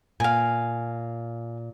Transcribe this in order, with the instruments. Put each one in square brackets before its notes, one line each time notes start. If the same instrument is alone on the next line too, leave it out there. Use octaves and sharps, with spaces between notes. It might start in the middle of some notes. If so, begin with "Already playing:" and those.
[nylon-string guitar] A#2 [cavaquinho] F5 G#5